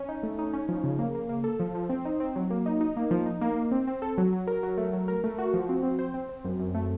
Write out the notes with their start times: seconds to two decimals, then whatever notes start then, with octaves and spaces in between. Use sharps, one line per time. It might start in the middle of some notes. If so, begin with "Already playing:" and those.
Already playing: C#4
0.09 D#4
0.23 A3
0.39 D#4
0.54 C#4
0.69 F3
0.84 C#3
0.99 A#3
1.15 A#3
1.29 A#3
1.44 A4
1.60 F3
1.75 F3
1.90 C4
2.05 D#4
2.20 C4
2.36 F#3
2.50 A#3
2.66 D#4
2.81 D#4
2.97 A#3
3.11 F3
3.26 D#4
3.41 A#3
3.56 A#3
3.71 C4
3.87 C4
4.02 A4
4.18 F#3
4.33 F#3
4.47 A#4
4.63 F#3
4.77 A3
4.93 F#3
5.08 A#4
5.24 A3
5.38 F#4
5.54 F3
5.69 C4
5.83 C4
5.99 C5
6.14 C4
6.29 C4
6.45 F#2
6.59 F#2
6.75 A3